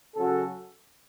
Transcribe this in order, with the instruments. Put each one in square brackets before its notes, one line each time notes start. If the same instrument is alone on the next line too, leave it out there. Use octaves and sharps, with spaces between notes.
[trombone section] C#3 F#3 C#4 F#4 A4